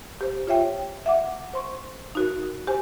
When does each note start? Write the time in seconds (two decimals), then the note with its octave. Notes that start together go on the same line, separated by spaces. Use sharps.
0.21 G4 C5
0.47 F4 C#5 E5 G5
1.06 E5 F#5 D6
1.53 C5 C6 C#6
2.15 D#4 F#4 A#4
2.67 G4 C5 G#5